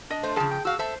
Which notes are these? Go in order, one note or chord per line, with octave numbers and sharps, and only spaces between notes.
D4 D#5
A3 C5
C#3 F3 G#4 A5
G5
F#4 F5 E6
A4 C5 E5 A5